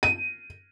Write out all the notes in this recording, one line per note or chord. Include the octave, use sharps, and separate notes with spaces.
D#7